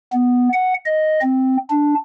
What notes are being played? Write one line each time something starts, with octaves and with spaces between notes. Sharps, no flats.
B3
F#5
D#5
C4
D4